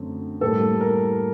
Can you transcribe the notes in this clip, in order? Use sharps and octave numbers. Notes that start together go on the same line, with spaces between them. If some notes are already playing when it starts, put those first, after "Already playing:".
Already playing: F#2 D3 A3 C4
A2 G3 A#3 A4
A#4